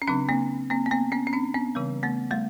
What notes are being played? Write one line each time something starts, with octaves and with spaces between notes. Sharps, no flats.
C#4
C#3 F#3 C4 D4
A#3 C4
A#3 C4
B3
A#3 C4
B3 C#4
C#4
C4 D4
B3 C#4
C#3 E3 G3
A3 B3
G3 A3